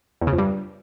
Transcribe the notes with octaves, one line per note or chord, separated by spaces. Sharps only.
E2
C#3
F2
G2